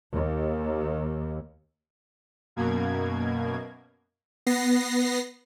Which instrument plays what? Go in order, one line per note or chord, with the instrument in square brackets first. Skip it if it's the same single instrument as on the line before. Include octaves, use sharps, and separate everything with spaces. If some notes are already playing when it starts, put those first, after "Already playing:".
[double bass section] D#2
[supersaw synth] F#2 B2 A#3 G#6
B3 A#6 C7